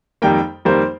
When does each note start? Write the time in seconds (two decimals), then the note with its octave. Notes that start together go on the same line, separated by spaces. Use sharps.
0.22 F2 D#3 G3 A#3 G5
0.65 F2 D#3 G3 A#3 C5